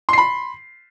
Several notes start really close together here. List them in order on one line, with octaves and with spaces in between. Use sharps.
C6 C7 B5